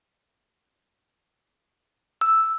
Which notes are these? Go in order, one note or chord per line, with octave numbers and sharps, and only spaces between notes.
E6